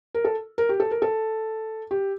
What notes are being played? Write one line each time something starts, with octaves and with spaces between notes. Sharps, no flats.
A#4
A4
A#4
G4
A4
A#4
A4
G4